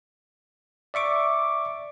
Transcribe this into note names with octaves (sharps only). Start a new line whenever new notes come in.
D5 E5 C#6 D6